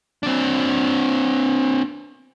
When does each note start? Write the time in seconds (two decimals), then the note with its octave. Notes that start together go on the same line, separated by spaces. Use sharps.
0.23 C4 D4